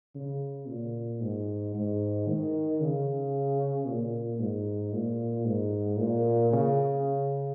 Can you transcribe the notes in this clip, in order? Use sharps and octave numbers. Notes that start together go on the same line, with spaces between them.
C#3
A#2
G#2
G#2
D#3
C#3
A#2
G#2
A#2
G#2
A#2
C#3